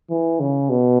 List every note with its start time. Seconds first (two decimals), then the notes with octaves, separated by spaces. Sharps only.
0.10 E3
0.40 C#3
0.70 B2